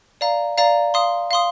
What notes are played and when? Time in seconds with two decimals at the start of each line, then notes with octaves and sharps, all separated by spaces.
0.21 D5 F5 A#5
0.58 D5 F5 A#5
0.94 F5 C6 D#6
1.31 F5 C6 D#6